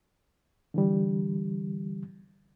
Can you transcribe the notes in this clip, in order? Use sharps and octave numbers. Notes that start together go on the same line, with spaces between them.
D3 E3 G3